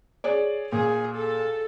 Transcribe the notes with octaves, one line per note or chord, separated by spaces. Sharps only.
G#4 C#5 D5
A#2 G#4
A4